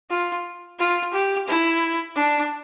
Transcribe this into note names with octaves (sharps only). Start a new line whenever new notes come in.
F4
F4
G4
E4
D4